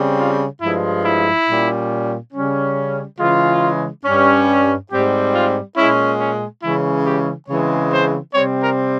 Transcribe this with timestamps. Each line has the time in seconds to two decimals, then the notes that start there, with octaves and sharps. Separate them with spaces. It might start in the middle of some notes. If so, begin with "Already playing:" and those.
Already playing: C#3 G3 C4
0.18 F4
0.61 G2 F3 G#3 E4
1.04 E4
1.48 A#2 G3 C#4
2.33 C#3 G3 C#4
3.19 C#3 E3 G#3 F4
4.05 G2 G3 C#4
4.91 G#2 G3 C4 G4
5.34 F4
5.77 A#2 G#3 C#4 E4
6.19 C#4
6.62 C#3 E3 G#3 C#4 E4
7.06 G4
7.48 C#3 E3 G#3 C4 C#5
7.92 C5
8.34 C3 G3 C4 C#5
8.62 A#4